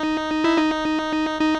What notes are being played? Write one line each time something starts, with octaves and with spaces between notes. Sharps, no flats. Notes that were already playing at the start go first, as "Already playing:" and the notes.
Already playing: D#4
E4
D#4
D#4